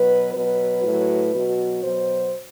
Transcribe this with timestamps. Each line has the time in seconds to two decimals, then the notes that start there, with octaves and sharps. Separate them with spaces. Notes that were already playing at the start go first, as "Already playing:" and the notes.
Already playing: B2 F#3 B4
0.32 B2 F#3 B4
0.82 A2 F#3
1.33 B2 F#3
1.82 B2 F#3 C5